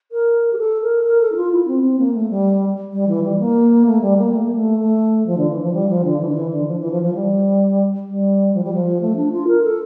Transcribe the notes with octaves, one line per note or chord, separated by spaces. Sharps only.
A#4
G4
A4
A#4
A#4
A4
E4
F4
E4
C4
C4
A#3
A3
G3
G3
E3
G3
A#3
A3
G3
A#3
A3
A#3
A3
A3
F3
D3
E3
F3
G3
F3
D3
E3
D3
E3
D3
F3
E3
F3
F3
G3
G3
F3
G3
F3
A3
D4
F4
A#4
A4